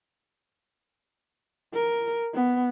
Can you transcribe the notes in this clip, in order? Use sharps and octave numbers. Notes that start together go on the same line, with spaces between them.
A#4
B3